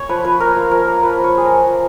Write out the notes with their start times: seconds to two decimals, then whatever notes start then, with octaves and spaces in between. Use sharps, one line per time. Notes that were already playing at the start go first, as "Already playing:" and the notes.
Already playing: C#5
0.09 F3 B4
0.24 F3 B4
0.40 A#3 A#4
0.56 F4
0.71 F3 A#4
0.87 A#3
1.03 F3 B4
1.19 F3
1.24 C#5
1.35 F3 G#4
1.46 A#4
1.51 A#3
1.66 F3